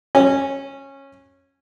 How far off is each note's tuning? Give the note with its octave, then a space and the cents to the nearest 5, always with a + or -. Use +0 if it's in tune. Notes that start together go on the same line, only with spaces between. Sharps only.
C#4 -15 F#4 +0